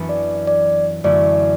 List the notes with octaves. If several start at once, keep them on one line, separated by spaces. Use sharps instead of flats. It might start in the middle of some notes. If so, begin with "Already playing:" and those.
Already playing: F#2 E3 B3 D4
D5
D5
F#2 D3 A3 E4 D5